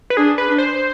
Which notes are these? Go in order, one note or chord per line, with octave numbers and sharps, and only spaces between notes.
B4
D4 G#4
B4
D4
C5